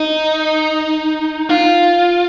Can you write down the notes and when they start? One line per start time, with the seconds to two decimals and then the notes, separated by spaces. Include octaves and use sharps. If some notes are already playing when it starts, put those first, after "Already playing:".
Already playing: D#4
1.49 F4